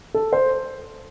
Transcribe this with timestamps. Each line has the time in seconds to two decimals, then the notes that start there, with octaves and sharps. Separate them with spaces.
0.14 A4
0.33 C5